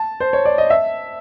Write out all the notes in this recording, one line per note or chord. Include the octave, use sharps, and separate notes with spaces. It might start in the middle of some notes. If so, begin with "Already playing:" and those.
Already playing: A5
C5
C#5
D5
D#5
E5